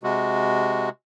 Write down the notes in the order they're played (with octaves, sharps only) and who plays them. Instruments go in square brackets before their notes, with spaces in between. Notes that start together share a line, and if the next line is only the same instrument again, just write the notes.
[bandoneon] C3 G#3 F#4